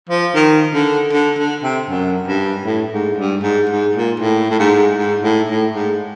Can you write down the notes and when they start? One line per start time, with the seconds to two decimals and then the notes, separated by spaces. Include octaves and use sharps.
0.09 F3
0.35 D#3
0.74 D3
1.13 D3
1.39 D3
1.63 C3
1.90 F#2
2.28 G2
2.66 A2
2.93 G#2
3.18 G2
3.43 G#2
3.70 G#2
3.96 A#2
4.20 A2
4.51 A2
4.60 G#2
4.98 G#2
5.24 A2
5.49 A2
5.74 G#2